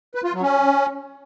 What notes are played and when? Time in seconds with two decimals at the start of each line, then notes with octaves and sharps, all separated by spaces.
0.15 B4
0.24 F4
0.33 F#3
0.42 C#4